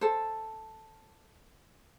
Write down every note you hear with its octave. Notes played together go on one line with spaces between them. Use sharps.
A4 C5